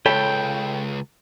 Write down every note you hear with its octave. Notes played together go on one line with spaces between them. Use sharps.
C#2 A4 C#5 G5 B5